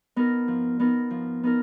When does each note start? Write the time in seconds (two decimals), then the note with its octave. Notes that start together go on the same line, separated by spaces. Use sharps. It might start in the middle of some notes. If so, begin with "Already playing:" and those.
0.16 B3 D#4 A#4
0.48 F3
0.80 B3 D#4 A#4
1.10 F3
1.43 B3 D#4 A#4